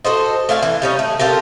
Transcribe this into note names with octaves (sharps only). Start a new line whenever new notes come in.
F#4 A4 C5 D#5
A3 D5 F5 G#5
E3
G3 C#4 D#4
A3
F4 G4 A4 A#4